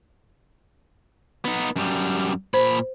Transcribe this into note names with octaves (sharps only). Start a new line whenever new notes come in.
B3 D#4
F#2 G3
A#2 C5 B5